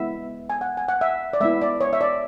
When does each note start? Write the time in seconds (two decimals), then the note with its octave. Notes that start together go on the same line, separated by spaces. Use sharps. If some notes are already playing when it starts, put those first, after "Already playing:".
Already playing: G#3 B3 E4 E5
0.50 G#5
0.61 F#5
0.77 G#5
0.89 F#5
1.01 E5
1.33 D5
1.40 G#3 B3 E4 E5
1.62 D5
1.81 C#5
1.93 E5
2.01 D5